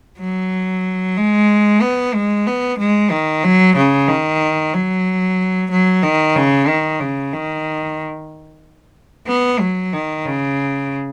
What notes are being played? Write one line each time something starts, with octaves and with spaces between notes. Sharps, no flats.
F#3
G#3
B3
G#3
B3
G#3
D#3
F#3
C#3
D#3
F#3
F#3
D#3
C#3
D#3
C#3
D#3
B3
F#3
D#3
C#3